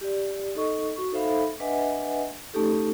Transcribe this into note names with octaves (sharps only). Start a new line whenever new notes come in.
G4 D5
D#4 A4 D#5 C#6
F#4 C#6
D#4 A4 C5 E5 F5 B5
D4 B4 D#5 E5 F#5 G#5
A3 C#4 D#4 G4 A4